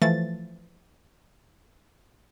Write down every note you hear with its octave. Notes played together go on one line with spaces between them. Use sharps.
E3 F3 A3 A6